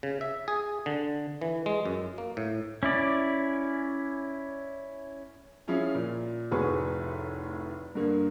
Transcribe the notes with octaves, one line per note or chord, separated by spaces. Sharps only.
C#3
E5
G#4
D3
E3
G#3
F#2
A#3
A2
C#4 E4 D5
F3 C#4 E4 F4 G#4
A#2
F1 A2 F#4 G#4 B4 C#6
G2 D3 A#3